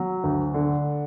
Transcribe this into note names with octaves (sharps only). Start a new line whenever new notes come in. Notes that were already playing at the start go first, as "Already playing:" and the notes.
Already playing: F#3
D2
D3